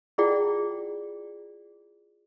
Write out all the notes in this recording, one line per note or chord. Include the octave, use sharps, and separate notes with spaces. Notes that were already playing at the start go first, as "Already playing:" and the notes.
E4 F4 G#4 D5 F#5 G5